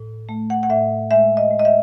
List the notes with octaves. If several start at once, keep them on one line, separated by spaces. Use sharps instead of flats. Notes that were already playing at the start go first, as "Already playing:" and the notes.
Already playing: A2
A3
F#5
F#5
A2 E5
G#3 E5
D#5
G#3
D#5
E5